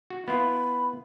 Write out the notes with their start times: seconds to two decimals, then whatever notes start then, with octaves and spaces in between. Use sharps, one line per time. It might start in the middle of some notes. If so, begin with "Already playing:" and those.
0.10 F#4
0.28 B3 E4 F4 B5